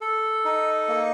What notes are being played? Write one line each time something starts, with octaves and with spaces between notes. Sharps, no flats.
A4
D#4
A#3